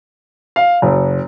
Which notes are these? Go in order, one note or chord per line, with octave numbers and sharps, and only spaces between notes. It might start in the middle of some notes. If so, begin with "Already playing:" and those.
F5
F#1